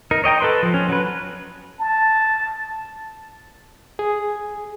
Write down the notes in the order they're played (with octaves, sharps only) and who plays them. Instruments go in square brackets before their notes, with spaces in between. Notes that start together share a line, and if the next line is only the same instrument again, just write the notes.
[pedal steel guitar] D#4 A#4
C#5 D#5 G5 A#5
A4 B4 C6
F3
C#4
F#3 B4
[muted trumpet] A5
[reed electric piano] G#4